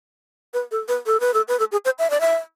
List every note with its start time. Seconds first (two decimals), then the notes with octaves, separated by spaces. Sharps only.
0.54 B4
0.71 A4
0.88 B4
1.06 A4
1.20 B4
1.34 A4
1.48 B4
1.59 A4
1.72 G#4
1.85 C5
1.99 E5
2.10 D5
2.21 E5